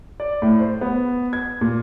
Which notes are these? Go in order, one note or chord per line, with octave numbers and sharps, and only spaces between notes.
D5
A2
C5
B3
G#6
A#2